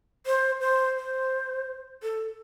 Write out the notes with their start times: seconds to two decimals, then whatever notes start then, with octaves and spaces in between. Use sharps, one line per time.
0.26 C5
0.61 C5
0.97 C5
2.03 A4